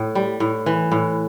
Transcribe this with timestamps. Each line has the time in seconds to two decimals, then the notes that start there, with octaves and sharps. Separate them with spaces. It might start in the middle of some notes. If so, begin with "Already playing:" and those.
Already playing: A2
0.15 G3
0.40 A2
0.66 E3
0.92 A2